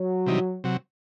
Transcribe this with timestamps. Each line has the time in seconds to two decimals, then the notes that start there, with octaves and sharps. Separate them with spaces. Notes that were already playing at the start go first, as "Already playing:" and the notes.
Already playing: F#3
0.26 C3 E3 G3 D#4
0.64 C3 F#3